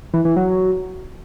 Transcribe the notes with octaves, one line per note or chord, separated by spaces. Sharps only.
E3
E3
F#3